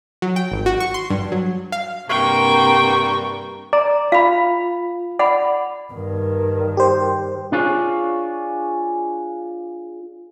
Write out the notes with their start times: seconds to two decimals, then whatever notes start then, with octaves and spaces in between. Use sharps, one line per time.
0.22 F#3
0.36 G5
0.52 G#1
0.66 F#4
0.80 C#6
0.94 C6
1.10 G2
1.32 F#3
1.72 F5
2.09 G2 C3 A#3 F#4 G5 C#6
3.73 D5 A#5
4.12 F4 F5 B5
5.19 D5 F#5 B5
5.93 G2 D#3
6.77 G4 C5
7.52 D4 F4 G#4 C#5